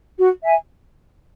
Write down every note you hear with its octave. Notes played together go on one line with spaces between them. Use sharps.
F#4
E5 G#5